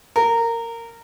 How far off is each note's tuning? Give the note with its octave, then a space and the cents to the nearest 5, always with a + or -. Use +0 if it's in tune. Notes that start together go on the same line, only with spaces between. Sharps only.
A#4 -15